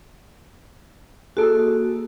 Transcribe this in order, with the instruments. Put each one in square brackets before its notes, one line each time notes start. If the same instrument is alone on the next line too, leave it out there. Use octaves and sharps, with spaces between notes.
[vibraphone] A#3 F#4 [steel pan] G#4 A4